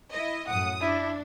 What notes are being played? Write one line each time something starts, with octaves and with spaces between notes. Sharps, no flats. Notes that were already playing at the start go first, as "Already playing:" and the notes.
E4 D#5
F#2 A2 F#5 D#6
D4 E4